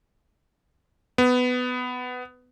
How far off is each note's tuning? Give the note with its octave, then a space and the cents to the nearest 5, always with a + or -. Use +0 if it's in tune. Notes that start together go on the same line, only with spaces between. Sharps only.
B3 +15